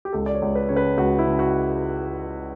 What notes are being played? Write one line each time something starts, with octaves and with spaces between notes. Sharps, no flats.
G4
C#2 A4
D5
C#5
C#2
B4
C#3 C#5
B4
C#2 F#4
E4
C#3
F#4